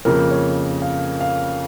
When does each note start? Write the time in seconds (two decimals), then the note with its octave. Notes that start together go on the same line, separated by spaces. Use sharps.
0.05 F2 C#3 F3 A#3 A#4
0.31 C#5
0.82 F5
1.21 F5